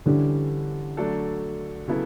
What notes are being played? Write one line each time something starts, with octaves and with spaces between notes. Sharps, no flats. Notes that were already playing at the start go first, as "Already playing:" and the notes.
D3 E3 G3 C#4 G4
F#3 A3 D4 A4
C#3 F#3 B3 E4 A4